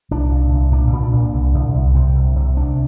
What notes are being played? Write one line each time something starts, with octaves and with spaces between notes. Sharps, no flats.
C2 D4
A#2
C2
A#2 D4
A#2
D4
A#2
C2
C2
C2
C3 C4
C2
C3
D2 D4